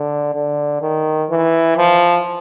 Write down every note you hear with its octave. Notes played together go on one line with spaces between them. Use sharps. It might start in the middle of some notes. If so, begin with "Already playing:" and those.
Already playing: D3
D3
D#3
E3
F3